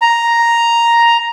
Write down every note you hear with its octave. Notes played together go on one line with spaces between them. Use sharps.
A#5